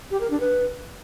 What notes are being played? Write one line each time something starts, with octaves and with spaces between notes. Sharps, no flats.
G4
A#4
D4
B4